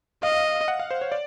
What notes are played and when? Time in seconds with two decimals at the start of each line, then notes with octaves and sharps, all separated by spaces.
0.23 D#5 F5
0.68 F#5
0.80 F5
0.91 C5
1.01 C#5
1.12 D5